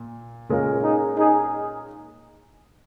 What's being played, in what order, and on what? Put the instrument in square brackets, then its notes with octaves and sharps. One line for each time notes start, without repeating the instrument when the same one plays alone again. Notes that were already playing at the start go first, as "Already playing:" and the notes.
Already playing: [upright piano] A#2
A#2 G#3 C#4 F4 A#4
[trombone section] D#4 G#4
D#4 G#4